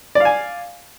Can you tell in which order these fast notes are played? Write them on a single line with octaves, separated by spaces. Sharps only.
D5 F5 G#5